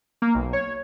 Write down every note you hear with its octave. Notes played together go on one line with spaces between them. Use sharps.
A#3
B1
C#5